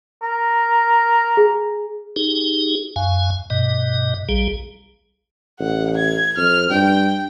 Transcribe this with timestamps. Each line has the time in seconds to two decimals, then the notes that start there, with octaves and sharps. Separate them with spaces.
0.22 A#4
1.37 G#4
2.16 D#4 G4 G#4
2.96 F#2 F5 G#5
3.50 G2 B2 D#5
4.29 A#1 G3 G#4
5.60 A1 F#5
5.97 G#6
6.37 F2 F6
6.70 G2 G5